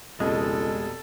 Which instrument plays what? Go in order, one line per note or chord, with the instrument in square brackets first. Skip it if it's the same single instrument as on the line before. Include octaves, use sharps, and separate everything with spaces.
[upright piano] F1 B2 D#5 [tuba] C#2 [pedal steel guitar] G#3 [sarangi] A4